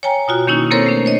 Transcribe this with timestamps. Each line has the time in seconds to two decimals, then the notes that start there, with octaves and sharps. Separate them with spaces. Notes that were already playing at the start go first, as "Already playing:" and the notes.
0.03 C#5 G5 G#5 A#5
0.28 B2 F4 F#4
0.47 D#3 A#3 C#4 D#4 E4
0.71 A#3 C4 A4 A#4 C5 C#5
0.86 A3 D4
1.05 C5 C#5 D#5